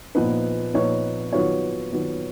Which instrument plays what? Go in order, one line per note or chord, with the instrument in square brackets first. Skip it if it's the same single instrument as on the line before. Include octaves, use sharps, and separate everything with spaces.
[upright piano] A#2 F3 B3 D#4 B4
A#2 F3 B3 D#4 C#5
D#3 F#3 B3 F4 C#5
D#3 F#3 B3 F4